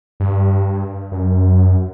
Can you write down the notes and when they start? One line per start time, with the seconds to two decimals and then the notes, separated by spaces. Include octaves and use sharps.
0.20 G2
1.12 F#2